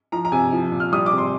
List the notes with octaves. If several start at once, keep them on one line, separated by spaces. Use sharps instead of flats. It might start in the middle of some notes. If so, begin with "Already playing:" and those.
F3 A#5
A#5
C3 G#5
F3
A#2
F6
G3 D#6
D6
C3
C6